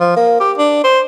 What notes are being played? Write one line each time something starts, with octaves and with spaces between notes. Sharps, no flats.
F3
A#3
G4
D4
C5